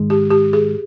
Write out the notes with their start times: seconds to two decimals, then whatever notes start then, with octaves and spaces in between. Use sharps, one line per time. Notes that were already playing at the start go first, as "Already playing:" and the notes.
Already playing: G#2 D#3 G#3
0.10 G4
0.31 G4
0.53 G#4